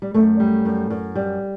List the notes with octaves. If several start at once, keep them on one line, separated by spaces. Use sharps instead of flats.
G3
F#2 A3
G3
F#2
F#2
G3